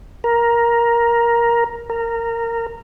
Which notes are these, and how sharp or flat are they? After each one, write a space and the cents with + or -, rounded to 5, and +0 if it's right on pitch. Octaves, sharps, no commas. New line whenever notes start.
A#4 +10
A#4 -15